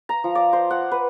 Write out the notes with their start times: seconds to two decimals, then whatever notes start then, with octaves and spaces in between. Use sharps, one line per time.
0.09 A#5
0.24 F3
0.35 D5
0.53 C5
0.71 F#5
0.91 B4